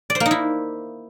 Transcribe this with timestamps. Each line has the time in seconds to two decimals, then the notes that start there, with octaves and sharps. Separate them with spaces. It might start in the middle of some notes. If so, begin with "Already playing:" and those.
0.10 D5
0.15 C5
0.20 A#3
0.26 D#4
0.31 E4